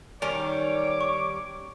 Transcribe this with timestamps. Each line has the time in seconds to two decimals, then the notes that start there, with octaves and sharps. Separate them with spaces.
0.22 D#3 G3 C#4 C#5 D5 D6 F7
1.01 C#6